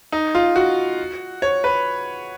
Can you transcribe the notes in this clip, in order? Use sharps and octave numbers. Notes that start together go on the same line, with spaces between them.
D#4
F4
F#4
C#5
B4